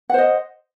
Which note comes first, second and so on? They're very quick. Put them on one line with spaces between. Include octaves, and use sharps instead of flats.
F#5 C5 D#5